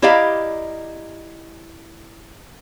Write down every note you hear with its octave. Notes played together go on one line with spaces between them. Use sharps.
E4 G4 D5 D#5 F5 A#5